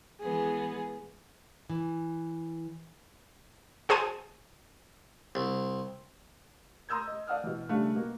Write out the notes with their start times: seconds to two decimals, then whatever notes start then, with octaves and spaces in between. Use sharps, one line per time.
0.21 E3 G#3 B3 G#4
1.70 E3
3.89 F#4 G#4 C5 G#5 A5
5.35 C2
6.89 A#5 C6 D#6 E6 G6 G#6
7.07 D#5
7.27 D5 F5 F#5 A5 D#6 F6
7.44 B2 E3
7.69 C#3 G3 A3 D4 F5 F#6
7.95 B2 A#3 F#4